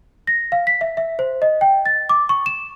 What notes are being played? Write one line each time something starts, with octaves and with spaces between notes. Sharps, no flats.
A#6
F5
B6
E5
E5
C5
D#5
G5
A6
D6
C#6
E7